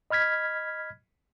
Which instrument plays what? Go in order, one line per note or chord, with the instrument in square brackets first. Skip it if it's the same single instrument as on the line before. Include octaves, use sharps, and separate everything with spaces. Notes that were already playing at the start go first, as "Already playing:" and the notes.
[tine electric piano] D#5 B5 F6 G#6 B6